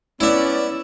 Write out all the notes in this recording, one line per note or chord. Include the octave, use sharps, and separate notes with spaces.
B3 C#4 E4 D5 E5